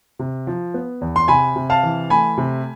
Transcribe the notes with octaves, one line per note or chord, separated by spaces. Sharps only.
C3
F3
B3
E2
C6
C3 G#5 B5
C3
F5 A5
E3
A3 G#5 B5
C3